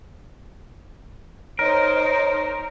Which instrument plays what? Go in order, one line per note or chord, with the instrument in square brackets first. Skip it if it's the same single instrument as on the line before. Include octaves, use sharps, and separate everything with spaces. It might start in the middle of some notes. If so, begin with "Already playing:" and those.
[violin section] D#4 C5 [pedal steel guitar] A#4 [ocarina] C#5